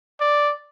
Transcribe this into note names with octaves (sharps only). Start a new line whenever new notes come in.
D5